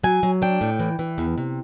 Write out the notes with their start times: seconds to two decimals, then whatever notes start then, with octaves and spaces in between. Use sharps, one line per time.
0.03 F#3 G#5
0.23 F#3
0.42 D4 G5
0.61 A2
0.80 E3
0.99 E3
1.18 E2
1.38 C3